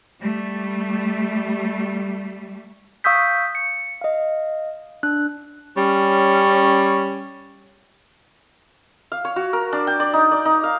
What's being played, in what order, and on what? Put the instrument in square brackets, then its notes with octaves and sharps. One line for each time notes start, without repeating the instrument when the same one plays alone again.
[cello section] G3 A3
[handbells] F5 C#6 D#6 E6 G6 B6
C#7
D#5 F5
D4 F#6
[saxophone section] G3 C#4
[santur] F5
C#5
F#4
A#4
D4
G5
D5
D#4
D5
D#4
F5